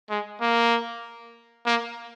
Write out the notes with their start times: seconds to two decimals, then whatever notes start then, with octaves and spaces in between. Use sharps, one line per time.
0.10 G#3
0.41 A#3
1.66 A#3